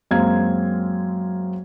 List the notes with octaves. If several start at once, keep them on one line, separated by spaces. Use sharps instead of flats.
F#2 G#3 A#3 C4 F5 G#6